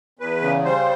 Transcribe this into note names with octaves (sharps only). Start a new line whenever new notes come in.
E2 B4
C#3
G3 C5